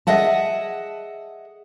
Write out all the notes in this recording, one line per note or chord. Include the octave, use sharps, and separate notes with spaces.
G#4 D#5 E5 F#5 A5